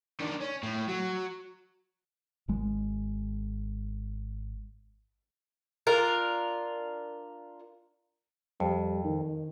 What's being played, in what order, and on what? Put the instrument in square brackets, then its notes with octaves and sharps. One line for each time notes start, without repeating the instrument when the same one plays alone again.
[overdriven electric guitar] D#3 D4
C#4
A2
F#3
[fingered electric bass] G#1 G#3
[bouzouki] D4 F4 A#4
[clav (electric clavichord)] F2 [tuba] G3
[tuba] D#3